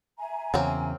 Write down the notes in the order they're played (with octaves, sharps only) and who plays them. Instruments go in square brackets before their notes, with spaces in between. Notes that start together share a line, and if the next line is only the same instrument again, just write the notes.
[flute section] E5 G#5 A#5
[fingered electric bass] E2 C#3 [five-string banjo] F#3 A#3 C4